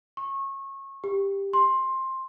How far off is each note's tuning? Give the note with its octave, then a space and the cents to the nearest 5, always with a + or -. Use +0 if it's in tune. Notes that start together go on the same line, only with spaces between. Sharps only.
C#6 -25
G4 +10
C6 +15